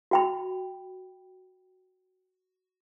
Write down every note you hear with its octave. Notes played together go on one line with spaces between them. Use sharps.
F#4 G5 B5